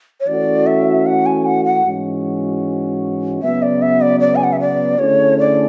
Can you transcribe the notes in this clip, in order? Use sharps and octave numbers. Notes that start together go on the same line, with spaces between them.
C#5
E3 A3 C#4 F#4 A4 D5
E5
F#5
G#5
F#5
F#5
G#2 E3 G#3 C#4 F#4
C#3 F#3 B3 E5
D5
E5
D5
D5
G#5
F#5
E5
D5
D3 A3 C#4 E4 G#4 C#5
D5